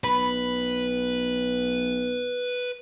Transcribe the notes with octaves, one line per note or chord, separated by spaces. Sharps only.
B1 B4 B5